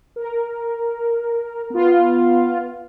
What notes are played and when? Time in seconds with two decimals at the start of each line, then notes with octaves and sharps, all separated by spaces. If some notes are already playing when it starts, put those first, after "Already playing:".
0.16 A#4
1.70 B3 F4